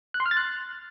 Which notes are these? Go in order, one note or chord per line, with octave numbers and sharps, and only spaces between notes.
F#6
C6
F6
A6
F#6